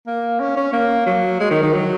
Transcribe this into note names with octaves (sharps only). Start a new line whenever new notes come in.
A#3
C#4
C#4
A#3
F#3
G#3
D#3
D#3
F#3